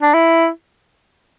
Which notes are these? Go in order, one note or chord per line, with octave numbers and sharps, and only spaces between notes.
D4
E4